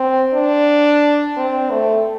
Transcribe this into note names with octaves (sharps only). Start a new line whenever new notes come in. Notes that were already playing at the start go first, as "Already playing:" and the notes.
Already playing: C4
D4
C4
A3